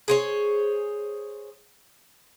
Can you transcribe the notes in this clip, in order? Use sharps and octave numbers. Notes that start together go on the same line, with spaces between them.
G#4 C5 C#5